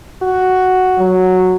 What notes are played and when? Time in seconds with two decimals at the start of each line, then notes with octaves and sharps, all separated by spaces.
0.22 F#4
0.98 F#3